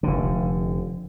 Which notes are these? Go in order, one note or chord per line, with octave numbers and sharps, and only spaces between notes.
F1 D3